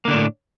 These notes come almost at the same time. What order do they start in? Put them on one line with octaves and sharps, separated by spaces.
A#3 D3 D4 A2